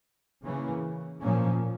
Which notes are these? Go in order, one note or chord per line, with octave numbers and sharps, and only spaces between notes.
C#3 E3 A#3 C#4
A#2 F3 A#3 C#4